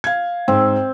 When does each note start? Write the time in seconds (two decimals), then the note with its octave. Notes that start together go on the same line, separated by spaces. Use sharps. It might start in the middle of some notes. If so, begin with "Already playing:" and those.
0.04 F5 G#6
0.48 G#2 C4